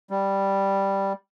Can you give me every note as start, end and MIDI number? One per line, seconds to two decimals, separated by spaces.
0.10 1.13 55